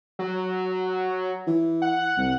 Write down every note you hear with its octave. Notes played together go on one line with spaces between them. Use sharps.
F#3
E3
F#5
C2